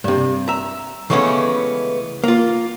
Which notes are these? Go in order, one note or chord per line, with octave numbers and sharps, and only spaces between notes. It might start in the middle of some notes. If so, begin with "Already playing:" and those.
G2 C3
E5 A#5
C#3 E3 G#3 A3 B3 C#4
A#3 F4